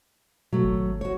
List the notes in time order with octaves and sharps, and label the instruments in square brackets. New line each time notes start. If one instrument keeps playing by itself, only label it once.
[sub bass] B2 [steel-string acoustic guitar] F#3 A3
[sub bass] G#1
[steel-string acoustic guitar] F#4 C#5